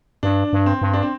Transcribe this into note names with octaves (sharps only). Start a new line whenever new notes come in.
G2 D4
G2
C4
G2
D4
C4